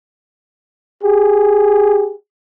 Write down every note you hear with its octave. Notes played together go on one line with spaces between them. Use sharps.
G4 G#4